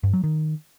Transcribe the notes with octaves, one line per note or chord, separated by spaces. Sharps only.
G2
F#3
D#3